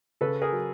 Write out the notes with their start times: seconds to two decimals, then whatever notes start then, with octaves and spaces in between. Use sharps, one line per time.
0.21 C#3 A4 B4
0.42 G#4 A#4
0.52 F#3